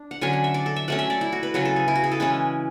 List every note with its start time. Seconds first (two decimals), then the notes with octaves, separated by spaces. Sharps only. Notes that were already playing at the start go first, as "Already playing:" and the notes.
Already playing: D4
0.11 F#5
0.21 D3 F#3 C#4 G#5
0.33 F#5
0.44 E5
0.54 D5
0.66 A4
0.76 E5
0.88 F#3 A3 C#4 F#5
0.99 E5
1.10 D5
1.21 E4
1.32 F#4
1.43 B4
1.54 C#3 F#3 C#4 B4
1.65 A4
1.76 G#4
1.88 E4
1.95 F#4
2.04 G#4
2.12 A4
2.20 E3 G#3 C#4 B4